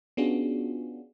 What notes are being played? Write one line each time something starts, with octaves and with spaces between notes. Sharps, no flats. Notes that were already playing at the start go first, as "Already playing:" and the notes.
B3 C#4 D4 F4 F#4 G#4